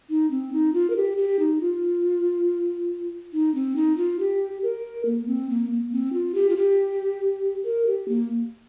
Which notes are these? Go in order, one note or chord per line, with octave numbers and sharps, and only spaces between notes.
D#4
C4
D#4
F4
A#4
G4
G4
D#4
F4
D#4
C4
D#4
F4
G4
A#4
A#3
C4
A#3
A#3
C4
F4
G4
F4
G4
A#4
G4
A#3